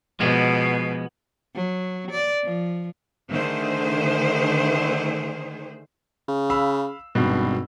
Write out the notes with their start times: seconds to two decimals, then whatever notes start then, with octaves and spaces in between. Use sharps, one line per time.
0.20 B2 F3 G#3 B3
1.55 F#3
2.11 D5
2.44 F3
3.31 D3 D#3 A3 G#4 C5
6.28 C#3
6.50 F5 B5 E6
7.15 G#1 G2 B2